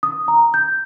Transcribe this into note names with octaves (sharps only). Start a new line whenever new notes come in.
D#6
A#5
G6